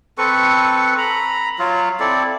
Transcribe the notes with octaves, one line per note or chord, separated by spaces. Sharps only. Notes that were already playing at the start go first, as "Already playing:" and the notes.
C4 A4 B4 C#6
A#5 B5
F#3 F4
C4 E4 A4 D5